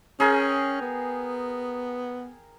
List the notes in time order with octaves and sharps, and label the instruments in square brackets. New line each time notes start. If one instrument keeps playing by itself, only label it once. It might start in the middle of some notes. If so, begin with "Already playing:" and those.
[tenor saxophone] C#4 [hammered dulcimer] G#4 A#4 G5
[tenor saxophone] B3